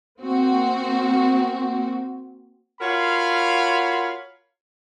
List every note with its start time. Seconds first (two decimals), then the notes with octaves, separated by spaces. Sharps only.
0.21 A#3 C4 F#4
2.81 F4 F#4 A#4 C#5 F5 B5